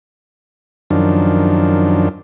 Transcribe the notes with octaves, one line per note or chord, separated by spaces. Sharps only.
F#2 D#3 F3 D4